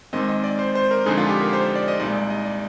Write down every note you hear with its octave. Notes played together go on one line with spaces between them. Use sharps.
G#2 D#3 G#3 C4 D#5
D#5
D5
C5
C5
A#4
F2 D3 G#3 D#4 G#4
F4
G4
A#4
C5
C5
D5
D#5
C2 A#2 G#3 D#4 D5
D#5
D5